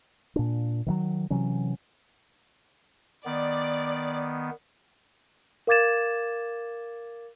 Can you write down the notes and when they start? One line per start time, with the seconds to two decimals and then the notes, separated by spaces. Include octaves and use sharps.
0.36 A#2 D4
0.86 D#3 F3 F#3
1.30 C3 E3 F#3 C#4
3.26 D#3 B3 D5
5.67 A#4 F5 D6 G#6 A6 E7